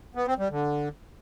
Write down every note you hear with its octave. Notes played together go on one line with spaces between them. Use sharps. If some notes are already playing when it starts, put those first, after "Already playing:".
B3
C4
G3
D3